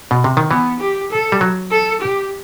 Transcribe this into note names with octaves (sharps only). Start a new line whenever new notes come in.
B2
C3
D#3
E3 B3
G4
A4
G3
F#3
A4
G4